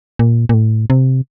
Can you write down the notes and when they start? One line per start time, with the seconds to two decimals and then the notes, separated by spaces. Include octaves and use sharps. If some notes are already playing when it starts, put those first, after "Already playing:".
0.19 A#2
0.49 A#2
0.54 A2
0.90 C3